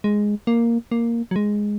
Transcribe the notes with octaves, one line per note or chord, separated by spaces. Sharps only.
G#3
A#3
A#3
F#3
G#3